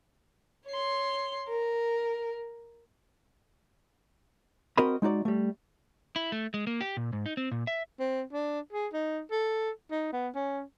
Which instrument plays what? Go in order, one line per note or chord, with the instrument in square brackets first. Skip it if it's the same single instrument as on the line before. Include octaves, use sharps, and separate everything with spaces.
[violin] C#5 C6
A#4
[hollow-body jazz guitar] C4 F#4 A#4 D#5 B5
G#3 D#4 F#4 D5
G3 A3
[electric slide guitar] E4
A3
G#3
A#3
G4
A#2
G#2
D#4
C4
A#2
E5
[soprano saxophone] C4
D4
G#4
D#4
A4
D#4
B3
C#4